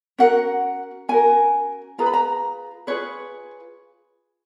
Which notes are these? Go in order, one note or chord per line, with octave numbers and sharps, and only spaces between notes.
C#4 F#4 A#4 F#5
C#4 F#4 A#4 G#5
F4 G#4 B4 A#5
B5
A#5
F4 G#4 B4 C#5